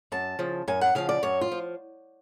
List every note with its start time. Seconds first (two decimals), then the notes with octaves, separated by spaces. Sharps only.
0.12 F#2 A5
0.39 C#3 F3
0.68 F#2 G#5
0.81 F#5
0.95 C#3 F3 F5
1.09 D5
1.23 F#2 C#5
1.41 F4
1.52 F3